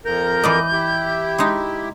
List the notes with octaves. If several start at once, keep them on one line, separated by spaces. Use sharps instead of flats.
F2 A#4 G6
E3 D5 D#5
E4 G4
G#3 D#4